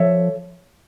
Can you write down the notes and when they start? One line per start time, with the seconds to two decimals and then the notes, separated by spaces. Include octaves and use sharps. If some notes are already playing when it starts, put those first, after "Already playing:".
Already playing: F3 A4 C#5 E5